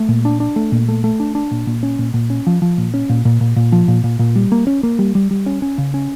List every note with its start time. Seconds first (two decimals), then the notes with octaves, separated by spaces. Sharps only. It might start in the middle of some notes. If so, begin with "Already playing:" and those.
Already playing: A3
0.09 A#2
0.25 D4
0.40 D4
0.56 A3
0.72 A#2
0.88 A3
1.04 A3
1.20 D4
1.35 D4
1.51 A#2
1.67 A#2
1.83 C#4
1.99 A#2
2.14 A#2
2.30 C#4
2.47 F3
2.62 F3
2.78 A#2
2.94 C#4
3.09 A#2
3.25 A#2
3.41 A#2
3.56 A#2
3.72 F3
3.88 A#2
4.04 A#2
4.19 A#2
4.36 G3
4.52 A#3
4.67 C#4
4.83 A#3
4.99 G3
5.15 G3
5.31 G3
5.46 C#4
5.62 C#4
5.78 C#3
5.94 C#4